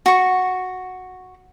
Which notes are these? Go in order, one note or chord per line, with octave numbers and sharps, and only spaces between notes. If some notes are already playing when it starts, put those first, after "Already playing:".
F#4 C#6